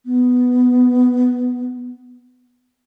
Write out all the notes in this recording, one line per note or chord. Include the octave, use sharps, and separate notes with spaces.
B3